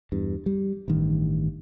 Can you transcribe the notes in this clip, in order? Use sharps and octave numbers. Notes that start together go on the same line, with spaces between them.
E2 G2
G3
A1 G2 D#3